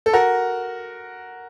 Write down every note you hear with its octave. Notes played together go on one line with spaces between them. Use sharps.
A4
F#4 A#4